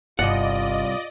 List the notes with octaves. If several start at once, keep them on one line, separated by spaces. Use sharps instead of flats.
G1 C2 F4 D5 D#5 F#5